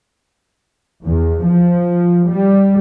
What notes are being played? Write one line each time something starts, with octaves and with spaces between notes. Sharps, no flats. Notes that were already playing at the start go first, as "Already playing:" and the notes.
E2
F3
G3